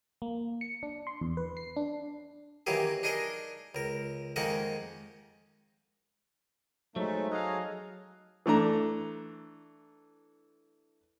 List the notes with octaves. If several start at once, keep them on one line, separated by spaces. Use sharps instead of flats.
A#3
C#7
D4
C6
E2
B4
C7
D4
D#3 E3 F#3 A#3 G4 G#4
D4 D#4 G#4 A#4 D#5
C#2 A#4
F2 D#3 G#3 A#3 A#4 F#5
F#3 G#3 A3 D#4 C5 C#5 A#5
D#4 G#4 A4 C#5 D#5 F5 A#5 F#6
E3 A3 D4 A#5